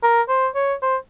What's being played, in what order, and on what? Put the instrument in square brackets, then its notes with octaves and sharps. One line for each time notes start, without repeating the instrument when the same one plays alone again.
[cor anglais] A#4
C5
C#5
C5